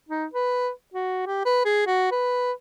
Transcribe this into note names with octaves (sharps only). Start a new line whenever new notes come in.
D#4
B4
F#4
G4
B4
G#4
F#4
B4